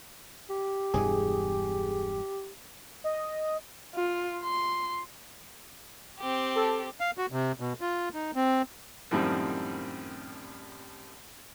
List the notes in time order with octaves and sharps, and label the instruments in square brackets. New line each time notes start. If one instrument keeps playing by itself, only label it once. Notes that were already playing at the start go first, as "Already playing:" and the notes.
[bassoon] G4
[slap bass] E1 G2 E3 [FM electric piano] G#4
[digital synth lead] D#5
[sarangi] F4
C6
[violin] C4 G4
[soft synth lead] A4
[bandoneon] F5
F#4
C3
B2
F4
D#4
C4
[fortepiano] F#2 A2 D#3 F3 G3 C4